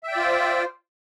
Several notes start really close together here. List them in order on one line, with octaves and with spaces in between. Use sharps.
E5 G5 D5 F4 C5